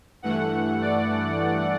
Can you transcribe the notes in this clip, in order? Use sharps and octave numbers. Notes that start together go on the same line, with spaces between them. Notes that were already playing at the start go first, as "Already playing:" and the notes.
G2 E3 A3 F#5
D5